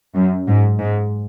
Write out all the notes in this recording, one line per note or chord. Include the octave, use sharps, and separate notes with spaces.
F#2
G#2
G#2